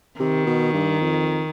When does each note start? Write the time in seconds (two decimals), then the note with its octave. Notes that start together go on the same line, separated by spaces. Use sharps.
0.20 C3 D#3
0.47 B2
0.74 G2
1.01 F2